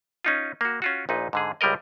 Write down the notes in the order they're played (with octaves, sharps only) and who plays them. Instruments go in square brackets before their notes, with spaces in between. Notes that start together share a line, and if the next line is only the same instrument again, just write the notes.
[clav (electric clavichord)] C#4 D#4 F4
A#3 F#4
C#4 F4 F#4
A#1 A#2 D#4 B4
G#2 D3 G#4
C#2 G3 G#3 A#4 D#5